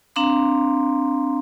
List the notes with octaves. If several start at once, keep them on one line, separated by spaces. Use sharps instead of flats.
C4 D4 F5 A#5 C6